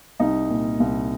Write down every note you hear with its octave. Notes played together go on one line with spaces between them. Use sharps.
C2 D#4
A#2
C2